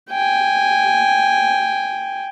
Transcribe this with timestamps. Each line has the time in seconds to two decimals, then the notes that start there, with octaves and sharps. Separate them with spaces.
0.10 G5 G#5